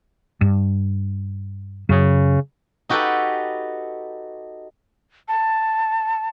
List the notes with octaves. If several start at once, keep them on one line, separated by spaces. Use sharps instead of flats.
G2
F#2 C#3
D#4 F#4 G4 A4 B4
A5